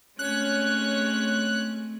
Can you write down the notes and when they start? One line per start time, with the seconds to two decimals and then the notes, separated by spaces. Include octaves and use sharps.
0.19 G#3 A3 C4 C#4 C#5 F#6